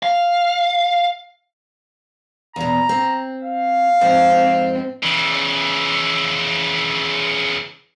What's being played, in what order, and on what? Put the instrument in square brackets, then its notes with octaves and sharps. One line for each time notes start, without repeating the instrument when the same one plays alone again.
[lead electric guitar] F5
[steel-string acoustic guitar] E2 B2 [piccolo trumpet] A#5
[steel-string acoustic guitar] C4
[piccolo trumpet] F5
[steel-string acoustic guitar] F2 G#2 C5 [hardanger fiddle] C4
[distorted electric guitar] C#3 E3